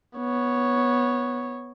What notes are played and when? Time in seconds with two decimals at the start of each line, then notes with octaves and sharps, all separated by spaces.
0.17 B3 C#5